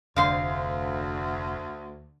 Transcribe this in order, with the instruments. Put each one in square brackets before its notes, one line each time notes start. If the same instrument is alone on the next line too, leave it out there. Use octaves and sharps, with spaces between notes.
[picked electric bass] F1 [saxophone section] D2 [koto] D3 G#4 C5 [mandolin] F5 C6